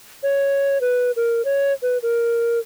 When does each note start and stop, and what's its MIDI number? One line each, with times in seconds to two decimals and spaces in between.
0.23 0.78 73
0.81 1.11 71
1.16 1.44 70
1.45 1.73 73
1.82 1.98 71
2.03 2.59 70